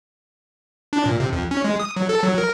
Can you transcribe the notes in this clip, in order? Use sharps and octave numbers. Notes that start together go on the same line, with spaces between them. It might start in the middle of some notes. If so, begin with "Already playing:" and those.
D4
A#2
C3
F2
C#4
G#3
D#6
F#3
A4
F#3
A#4